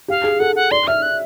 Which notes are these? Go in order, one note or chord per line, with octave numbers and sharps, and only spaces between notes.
G4 F5
G#4
A4 F#5
F#5
D5 C6
E5 F6
F#6